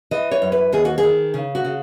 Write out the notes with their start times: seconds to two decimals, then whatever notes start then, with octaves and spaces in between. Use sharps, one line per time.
0.11 E3 D#5
0.31 C#5
0.42 F#2
0.52 B4
0.72 D#2 G#4
0.85 F#4
0.98 G#4
1.03 D#3
1.34 C#3
1.55 F#4
1.65 C#3